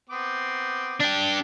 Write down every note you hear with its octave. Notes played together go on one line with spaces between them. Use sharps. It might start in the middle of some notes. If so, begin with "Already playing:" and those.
B3 C4 D6
D4 G4